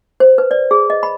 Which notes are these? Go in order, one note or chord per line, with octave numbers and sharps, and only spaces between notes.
C5
B4
D5
G#4
D#5
B5